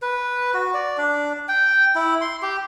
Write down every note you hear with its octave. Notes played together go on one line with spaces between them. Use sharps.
B4
F#4
D5
D4
G5
E4
C6
G4